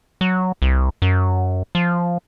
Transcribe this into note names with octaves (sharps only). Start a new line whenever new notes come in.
F#3
C2
F#2
F3